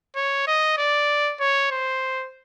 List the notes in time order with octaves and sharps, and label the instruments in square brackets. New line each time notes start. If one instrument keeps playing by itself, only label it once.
[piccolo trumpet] C#5
D#5
D5
C#5
C5